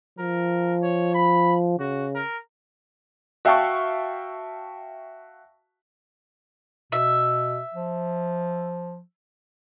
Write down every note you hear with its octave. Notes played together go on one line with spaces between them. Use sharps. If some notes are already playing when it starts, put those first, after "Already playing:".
F3 A#4
C#5
B5
C#3 F#4
A#4
F#4 E5 F5 G5 A5 C#6
B2 E5
F3